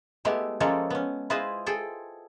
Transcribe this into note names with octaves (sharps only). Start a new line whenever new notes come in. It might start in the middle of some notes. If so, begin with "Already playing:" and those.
G#3 A3 B3 E4 G4
F3 G#3 A#3 C#4 A4 C#5
B3 C#4
E4 F4 G#4 B4 C5 D#5
G#4 A4 G5